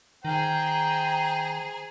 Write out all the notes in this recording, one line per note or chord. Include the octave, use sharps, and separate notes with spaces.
D#3 G#4 C5 G5 A#5